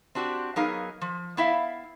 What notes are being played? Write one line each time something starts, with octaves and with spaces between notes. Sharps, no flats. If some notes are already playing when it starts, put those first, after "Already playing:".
C4 D4 F#4 G4
F#3 B3 D#4 G#4 A#4 F5
F3
B3 E4 E5 F5